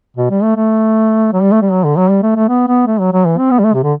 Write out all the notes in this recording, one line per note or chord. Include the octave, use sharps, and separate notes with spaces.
B2
G3
A3
A3
F#3
G3
A3
G3
F#3
D3
F#3
G3
A3
A3
B3
B3
A3
F#3
F#3
E3
C4
B3
G3
A3
C3
D3